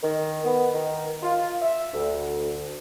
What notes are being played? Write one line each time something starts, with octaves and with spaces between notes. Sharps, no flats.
D#3
B3
D#3
F4
E5
D2